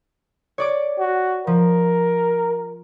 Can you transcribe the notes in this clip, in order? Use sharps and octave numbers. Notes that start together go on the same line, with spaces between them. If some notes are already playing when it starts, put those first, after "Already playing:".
C#5 D5 D6
F#4
F3 A#4